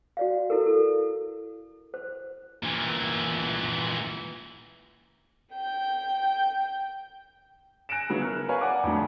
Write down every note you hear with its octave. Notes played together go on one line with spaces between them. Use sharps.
F#4 D5 F5
E4 F#4 A4 A#4
A4
C5
A#2 E3
G5 G6
G#5 F#6 A#6 C#7 D7 E7
C#3 F#3 B3 C#4 E4
A#4 F#6
B4 C#5 F5 G#5 A#5
D5 F#5 G#5 D6
F2 A2 D3 F#3